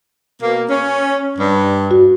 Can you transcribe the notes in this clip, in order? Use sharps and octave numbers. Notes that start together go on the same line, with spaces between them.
B2 A#3
C#4
G2
F#4